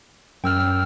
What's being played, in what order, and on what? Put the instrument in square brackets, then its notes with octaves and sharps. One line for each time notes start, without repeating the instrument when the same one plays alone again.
[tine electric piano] F#2 [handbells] G5 E6 F6